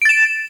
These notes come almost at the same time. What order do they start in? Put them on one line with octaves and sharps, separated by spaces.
D7 A6 E7